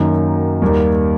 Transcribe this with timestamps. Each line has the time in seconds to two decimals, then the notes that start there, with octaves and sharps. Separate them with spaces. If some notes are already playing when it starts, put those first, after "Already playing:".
Already playing: F#2 D#3 F#3 A#3
0.62 D#2 D#3 G3 A#3